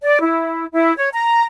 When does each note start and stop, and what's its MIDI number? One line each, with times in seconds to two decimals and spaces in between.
0.02 0.17 74
0.22 0.64 64
0.71 0.93 64
0.98 1.09 73
1.12 1.44 82